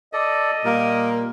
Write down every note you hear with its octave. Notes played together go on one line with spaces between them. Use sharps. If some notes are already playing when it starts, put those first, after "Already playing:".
A4 D5 D#5
A#2 G3 A#3 A#4